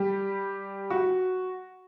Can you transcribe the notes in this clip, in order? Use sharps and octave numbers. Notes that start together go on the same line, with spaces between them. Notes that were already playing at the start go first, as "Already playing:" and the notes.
Already playing: G3 G4
F#4